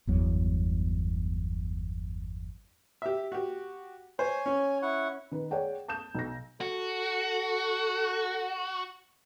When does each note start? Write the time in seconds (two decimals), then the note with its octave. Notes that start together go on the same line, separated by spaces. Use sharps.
0.07 G1 E2 F#3
3.02 G4 E5
3.32 F#4 G4
4.19 C5 C#5 G#5
4.46 C#4
4.82 E4 F#5 C#6
5.31 D#3 B4
5.51 G#4 C#5 D5 F#5 G5
5.88 A5 D#6 G6 E7
6.14 B1 A#6
6.61 F#4 A4